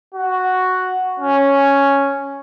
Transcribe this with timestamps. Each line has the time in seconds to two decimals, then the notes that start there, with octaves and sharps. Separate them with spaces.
0.14 F#4
1.20 C#4